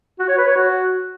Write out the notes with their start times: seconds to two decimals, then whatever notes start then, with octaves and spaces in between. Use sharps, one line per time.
0.19 F#4
0.29 C#5
0.38 B4
0.47 C#5
0.56 F#4